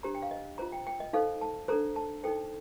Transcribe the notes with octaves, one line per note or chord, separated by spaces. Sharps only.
D4 G4 C5 A#5
G5
F5
D#5
F4 C5 A#5
G5
G5
D#5
D#4 A4 C5 F5
A5
D4 A4 C5 A#5
A5
D#4 A4 C5 G5